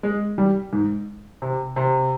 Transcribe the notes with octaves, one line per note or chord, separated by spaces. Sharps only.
G#3
G3
G#2
C3
C3